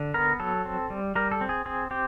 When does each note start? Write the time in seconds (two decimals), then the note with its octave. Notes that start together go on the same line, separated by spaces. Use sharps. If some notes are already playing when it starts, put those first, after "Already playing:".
Already playing: D3
0.14 B3 A#4
0.40 F#3 A4
0.65 C4
0.90 G3
1.15 G3 A#4
1.32 A4
1.41 C4
1.49 G#4
1.66 C4 G#4
1.91 C4 G4